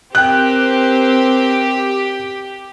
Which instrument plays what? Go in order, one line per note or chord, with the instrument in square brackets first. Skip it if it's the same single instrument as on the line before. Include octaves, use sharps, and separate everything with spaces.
[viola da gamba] C4 A#4 C5 [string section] G4 [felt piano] G5 F#6